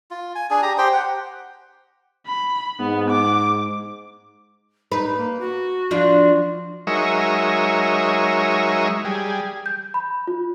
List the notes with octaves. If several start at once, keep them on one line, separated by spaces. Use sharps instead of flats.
F4
G#5
D4 G#4 G#5
G4 A#5
G4 C5 G5
F#5
B5
G#2 B3
D6
D#4 B4
A#3
F#4
F3 D4 F4
F#3 G#3 D#4 A#4 C#5 E5
G3 G#4
G6
B5
F4